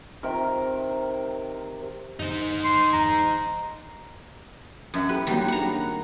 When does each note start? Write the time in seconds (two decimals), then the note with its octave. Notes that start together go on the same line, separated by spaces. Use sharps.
0.23 C3 D#3 A#4
2.19 F#2 D3 D#3 D#4 C5
2.64 C6
2.93 G1 E2 A#5
4.94 F#2 B4 E5 F#5
5.09 E4 G4 A4 B4
5.27 D#3 F#3 G3 A#3 C4
5.48 F#3 D4 G#4 F#5 A#5